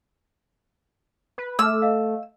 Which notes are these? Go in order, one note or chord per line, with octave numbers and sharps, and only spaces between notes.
B4
A3 D6 E6 F6
D#5 F5